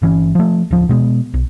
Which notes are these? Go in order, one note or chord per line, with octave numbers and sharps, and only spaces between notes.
G1 E3 C#4
F3 A3
D1 F3
B2 G#3 B3
B1